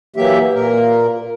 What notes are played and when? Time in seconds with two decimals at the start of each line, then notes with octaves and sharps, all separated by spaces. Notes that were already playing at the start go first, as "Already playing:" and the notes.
0.16 E3 F#3 A#3 G4 E5
0.53 A#2 A#3 A#4